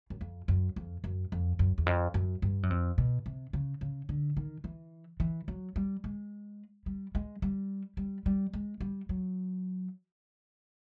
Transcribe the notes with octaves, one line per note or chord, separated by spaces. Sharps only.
F#2
F2
F#2
F2
F#2
F2
F#2
E2
F2
F#2
G2
F#2
F2
B2
C3
C#3
C#3
D3
D#3
E3
E3
F#3
G3
G#3
G3
G#3
G3
G3
G3
G#3
G3
F#3